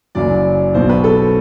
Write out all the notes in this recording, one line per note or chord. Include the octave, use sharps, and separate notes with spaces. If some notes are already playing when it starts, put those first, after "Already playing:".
F#1 F#2 F#3 D5
B1 B2 F#3 C5
B4
A4